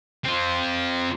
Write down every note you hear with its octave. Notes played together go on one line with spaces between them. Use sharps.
C4 F4